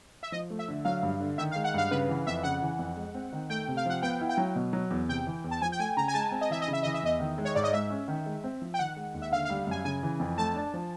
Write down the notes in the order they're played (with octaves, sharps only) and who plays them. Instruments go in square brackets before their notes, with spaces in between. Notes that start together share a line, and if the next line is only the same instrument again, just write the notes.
[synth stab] E5
[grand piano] F3 [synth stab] D#5
[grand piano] A3
[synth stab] E5
[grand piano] D3
[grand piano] F#3 [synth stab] F5
[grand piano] G2
D3
[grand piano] D#3 [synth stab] E5
[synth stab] F5
[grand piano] G#3
[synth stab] F#5
[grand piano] G2 [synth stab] F5
[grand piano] C#3 [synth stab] B4
[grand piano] E3
[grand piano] F2 [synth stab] E5
[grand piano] C#3 [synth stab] F#5
[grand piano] E3
F2
G#3
C4
D#3
[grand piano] A3 [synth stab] G5
[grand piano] C3
[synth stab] F5
[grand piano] F3 [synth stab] F#5
[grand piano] B3 [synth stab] G5
[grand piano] E4
[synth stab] G5
[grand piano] F#3
B2
F#3
E2
[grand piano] C3 [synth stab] G5
[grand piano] E3
E2
[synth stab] A5
[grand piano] F3 [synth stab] G#5
[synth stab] G5
[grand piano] A3 [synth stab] G#5
[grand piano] C#3 [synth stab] A#5
[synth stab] G#5
[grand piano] G#3 [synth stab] A5
[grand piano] C4
[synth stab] D#5
[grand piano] E3 [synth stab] E5
[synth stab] D#5
[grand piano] C#3
[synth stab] E5
[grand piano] E3 [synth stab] D#5
[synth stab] E5
[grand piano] E2 [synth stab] D#5
[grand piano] D#3
G#3
[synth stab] C#5
[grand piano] G#2 [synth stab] D5
[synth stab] D#5
[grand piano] G#3 [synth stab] E5
[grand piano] C#4
D#3
G#3
C4
F3
[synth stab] G5
[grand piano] D#3 [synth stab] F#5
[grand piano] G#3
D#2
[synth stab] E5
[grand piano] D3 [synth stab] F5
[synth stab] F5
[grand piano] G3
[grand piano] F#2 [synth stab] G#5
[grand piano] C#3 [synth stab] G#5
[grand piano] E3
F2
[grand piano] A3 [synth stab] A5
[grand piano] D4
F3